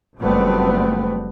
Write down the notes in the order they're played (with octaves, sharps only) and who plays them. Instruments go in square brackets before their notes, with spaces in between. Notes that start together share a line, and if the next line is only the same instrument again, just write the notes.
[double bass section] F#1 F2 G3 A3 B3 C4